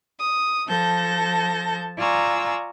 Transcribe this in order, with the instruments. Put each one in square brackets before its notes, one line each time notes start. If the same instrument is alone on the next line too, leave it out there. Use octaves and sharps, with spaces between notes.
[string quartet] D#6
F3 A4 A5 G6 A#6
F4 D5 G#5 A#5 C#6 E6